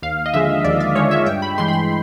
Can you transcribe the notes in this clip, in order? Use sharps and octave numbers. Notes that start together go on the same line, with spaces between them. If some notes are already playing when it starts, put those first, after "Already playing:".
D#2 F5
D#5
D3 F3 G#3 E5
D#2 D5
D5
D3 F3 G#3 C#5
E5
G2 G5
B5
E3 G#3 C6
B5
C6